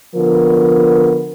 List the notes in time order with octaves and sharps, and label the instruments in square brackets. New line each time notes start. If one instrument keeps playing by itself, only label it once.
[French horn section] D3 F3 B3 A#4